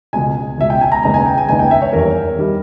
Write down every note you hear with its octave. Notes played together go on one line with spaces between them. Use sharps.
C#2 B2 G#3 G#5
C#2 B2 G#3 E5
G5
G#5
A#5
D#2 C#3 G#3 B3 D#4 A#5
G#5
G5
G#5
D#2 C#3 G#3 B3 D#4 G#5
G5
E5
C#5
E2 D#3 G3 A#4
D#3 G3